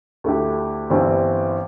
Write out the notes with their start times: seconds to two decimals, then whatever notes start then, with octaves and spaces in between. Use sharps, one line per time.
0.24 D2 D3 A3 E4 G4
0.90 G1 G2 E3 G3 C4